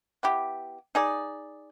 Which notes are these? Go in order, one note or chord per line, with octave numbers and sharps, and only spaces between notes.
B3 E4 G4
D#4 G#4 D5